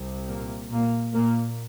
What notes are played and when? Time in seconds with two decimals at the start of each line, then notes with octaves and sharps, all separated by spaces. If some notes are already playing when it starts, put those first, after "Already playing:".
Already playing: C2 C3
0.28 A#2 A#3
0.71 A#2 A#3
1.14 A#2 A#3